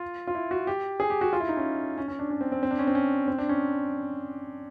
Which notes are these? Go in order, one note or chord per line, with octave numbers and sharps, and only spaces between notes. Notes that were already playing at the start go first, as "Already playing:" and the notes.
Already playing: F4
F4
E4
F#4
G4
G#4
G4
F#4
F4
E4
D#4
C#4
C#4
C#4
D4
C#4
C4
C4
C4
D4
C#4
C4
C#4
C4
D4
C#4